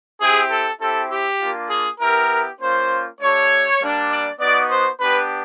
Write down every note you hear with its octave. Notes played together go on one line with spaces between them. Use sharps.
C4 E4 G4 G#4
A4
C4 E4 G4 A4
G4
A#3 D4 F4
G#4
B3 E4 G4 A#4
A#3 C#4 F4 C5
A3 D4 G4 C#5
G3 A#3 D4
D5
B3 D#4 F#4 D5
C5
B3 D4 G4 B4